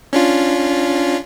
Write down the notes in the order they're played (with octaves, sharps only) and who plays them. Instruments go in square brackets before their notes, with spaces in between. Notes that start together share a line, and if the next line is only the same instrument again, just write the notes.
[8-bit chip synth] C#4 D4 F4